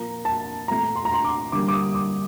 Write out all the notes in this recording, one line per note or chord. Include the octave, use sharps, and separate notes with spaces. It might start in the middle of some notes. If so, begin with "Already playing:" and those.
Already playing: A#2 F3 A#3 A#5
A5
A#2 A3 A#5
C6
A#5
C6
D6
D3 G3 A#3 D6
D6
D#6
D6